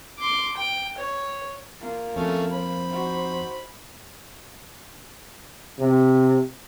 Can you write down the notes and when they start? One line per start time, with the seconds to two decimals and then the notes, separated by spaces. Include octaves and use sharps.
0.19 C6 D6
0.57 G5
0.98 C#5
1.81 A#3 F4
2.16 F2 A3 C#4
2.53 C5 B5
2.90 D#4 F#4
5.79 C3